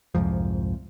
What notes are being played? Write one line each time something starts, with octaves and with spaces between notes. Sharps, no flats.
C2 F2 G#2 F3